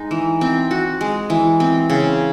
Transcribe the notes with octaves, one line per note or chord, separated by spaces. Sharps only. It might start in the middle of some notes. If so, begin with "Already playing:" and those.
Already playing: G#3 D#4
E3
C4
F#4
G#3
E3
C4
C#3